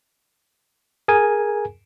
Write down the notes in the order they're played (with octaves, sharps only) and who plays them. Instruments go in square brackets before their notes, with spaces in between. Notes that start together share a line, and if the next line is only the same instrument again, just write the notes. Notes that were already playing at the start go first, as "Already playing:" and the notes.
[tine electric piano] G#4 A#4 G#5